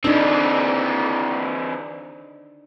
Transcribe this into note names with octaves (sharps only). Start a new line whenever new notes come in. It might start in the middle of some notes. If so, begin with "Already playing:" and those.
E3 C4 D4 D#4